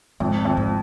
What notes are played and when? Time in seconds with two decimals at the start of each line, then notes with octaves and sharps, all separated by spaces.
0.20 F2 G#2
0.45 F2
0.57 G#2